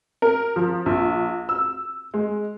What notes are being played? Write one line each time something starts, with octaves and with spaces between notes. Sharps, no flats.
A#4
F3
A#1
E6
G#3